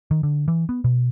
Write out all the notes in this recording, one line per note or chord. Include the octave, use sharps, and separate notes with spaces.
D#3
D3
E3
B3
B2